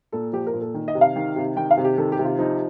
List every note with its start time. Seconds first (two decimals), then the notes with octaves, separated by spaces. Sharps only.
0.12 A#2 A4
0.33 F3 G4
0.47 A#4
0.54 A#2
0.61 A4
0.74 D#3
0.88 D#5
0.95 C3
1.01 F5
1.16 D#3
1.36 C3
1.57 D#3 G5
1.71 F5
1.77 C3
1.84 G4
1.98 D#3 A4
2.12 G4
2.19 C3
2.25 F4
2.39 F3 D#4